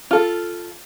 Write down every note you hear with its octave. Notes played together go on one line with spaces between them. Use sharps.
F4 A4